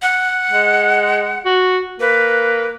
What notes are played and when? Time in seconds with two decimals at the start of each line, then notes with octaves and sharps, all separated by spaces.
0.02 F#5
0.51 G#3
1.45 F#4
2.00 A#3 B4